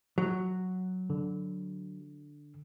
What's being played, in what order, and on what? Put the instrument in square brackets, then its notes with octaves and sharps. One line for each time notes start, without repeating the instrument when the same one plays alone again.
[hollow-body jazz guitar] F#3
[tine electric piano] D3